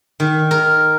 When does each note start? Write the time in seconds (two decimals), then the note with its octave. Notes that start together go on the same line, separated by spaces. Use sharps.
0.20 D#3
0.51 A#4